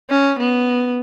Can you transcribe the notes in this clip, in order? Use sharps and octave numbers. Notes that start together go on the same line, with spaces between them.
C#4
B3